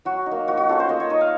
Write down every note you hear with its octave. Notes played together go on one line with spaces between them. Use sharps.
F#3 F#4
D#4
A#3
F3 F#4
F#4
A3 C#4 F4 A4
C5
A#3 D#5
C#5
D#4 D#5
F5